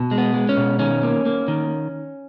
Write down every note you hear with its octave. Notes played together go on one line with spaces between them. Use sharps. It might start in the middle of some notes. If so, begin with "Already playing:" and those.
Already playing: B2
G#3
B3
G#3
C#4
B2
D#3 C#4
A#3
A#3
D#3